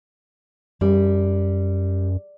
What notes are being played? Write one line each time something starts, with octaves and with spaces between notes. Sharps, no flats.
F#2 G3